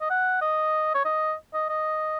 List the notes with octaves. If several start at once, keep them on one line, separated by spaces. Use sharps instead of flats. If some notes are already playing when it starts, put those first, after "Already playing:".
D#5
F#5
D#5
C#5
D#5
D#5
D#5